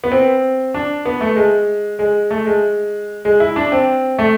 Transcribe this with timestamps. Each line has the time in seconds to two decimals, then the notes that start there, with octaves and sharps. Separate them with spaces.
0.04 B3
0.12 C4
0.74 D4
1.05 B3
1.21 A3
1.36 G#3
1.99 G#3
2.31 A3
2.46 G#3
3.25 G#3
3.40 E4
3.56 D4
3.72 C4
4.19 A3